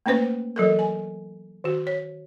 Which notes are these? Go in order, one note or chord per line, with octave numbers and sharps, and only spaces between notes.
A3 A#3 C#4 B4 C5
E3 F#3 A4 A#4
G#5
D#3 F#4
C#5